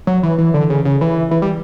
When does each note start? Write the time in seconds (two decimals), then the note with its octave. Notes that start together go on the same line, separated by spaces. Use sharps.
0.07 F#3
0.23 E3
0.38 E3
0.54 D3
0.70 C#3
0.85 C#3
1.01 E3
1.31 E3
1.42 G3